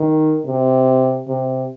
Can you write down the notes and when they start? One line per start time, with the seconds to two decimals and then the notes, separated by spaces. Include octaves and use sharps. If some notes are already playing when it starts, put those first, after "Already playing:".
Already playing: D#3
0.45 C3
1.28 C3